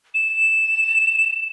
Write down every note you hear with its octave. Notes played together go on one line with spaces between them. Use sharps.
E7